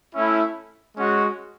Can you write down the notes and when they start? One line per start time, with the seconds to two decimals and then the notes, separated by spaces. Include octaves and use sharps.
0.13 A3 C#4 E4
0.97 G#3 C#4 F#4